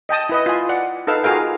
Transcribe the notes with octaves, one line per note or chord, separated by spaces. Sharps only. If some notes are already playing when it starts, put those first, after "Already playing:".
D#5 G5 A5 D#6
E4 B4 D#5
F4 G#5
D5 F#5
D#4 A4 B4 F5 E6
F4 F#4 G#4 A#4 F5 G5